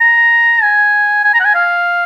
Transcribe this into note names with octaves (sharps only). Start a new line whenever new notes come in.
A#5
G#5
G#5
A#5
F#5
G#5
F5